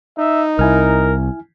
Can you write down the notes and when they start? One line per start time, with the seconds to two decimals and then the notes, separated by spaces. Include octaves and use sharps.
0.18 D#4 E5
0.59 C2 E4 A#4 G#5 F6